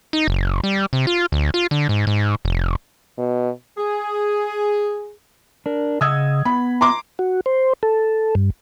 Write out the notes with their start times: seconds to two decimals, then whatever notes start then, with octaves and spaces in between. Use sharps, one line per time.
0.13 D#4
0.28 F#1
0.64 G3
0.93 C3
1.07 F4
1.32 D2
1.54 F4
1.71 D3
1.89 G#2
2.07 G#2
2.45 F1
3.18 B2
3.77 G#4
5.66 D4 A#4
6.01 C#3 D#5 F#5 D#6 E6 G#6
6.45 B3 B5
6.81 A#5 C6 D6
7.19 F#4
7.46 C5
7.83 A4
8.35 G2